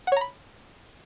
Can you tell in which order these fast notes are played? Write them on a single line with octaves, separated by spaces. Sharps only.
F#5 C#5 A#5 B5